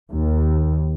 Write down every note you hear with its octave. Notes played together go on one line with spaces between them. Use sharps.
D#2